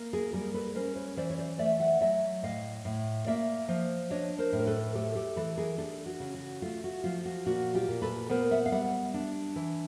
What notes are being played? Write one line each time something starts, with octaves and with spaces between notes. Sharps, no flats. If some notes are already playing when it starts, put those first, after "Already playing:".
Already playing: A#3
G#4 A#4
G3 G#4 A#4
A4 B4
C#4 A#4 C5
B4 C#5
E3 C5 D5
C#5
C5 D5
A3 D5 E5
E5 F#5
F#3 D5 E5
A2 D#5 F5
A2
A#3 D5 E5
F3
D4 C#5 D#5
A#4 C5
A2
A#4
A4 B4
A3 G4 A4
G4 A4
E3 A4 B4
G#4 A#4
D4 G4 A4
F#4
C#3
F#4
A3 F4
F#4
F3 F4
F#4
A#2 F#4
F4 G4
A#2
A4 B4
B3 A#4 C5
E5 F#5
F5
G3 E5 F#5
D4
E3